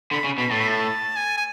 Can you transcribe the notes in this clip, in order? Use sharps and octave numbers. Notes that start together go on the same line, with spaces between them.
D3 B5
C#3
B2 B5
A2 A5
B5
A5
G#5
G#5